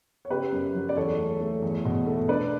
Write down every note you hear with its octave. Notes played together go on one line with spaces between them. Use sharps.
C#5
C#3 G4 B4
F#2
F#3
D5
E2 A4 C#5
A3
A3
E2
B2
A3
D4 B4 D5